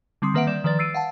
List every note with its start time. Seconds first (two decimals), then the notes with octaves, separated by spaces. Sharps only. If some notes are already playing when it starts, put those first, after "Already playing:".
0.22 D3 G3 C4 C6 D#6
0.34 D#3 A#3 B4 E5 F#5 D7
0.47 G3 D5 E7
0.64 D#3 F3 B4 D5 A6
0.79 E6 A6 C7 D7 D#7
0.94 F5 F#5 A5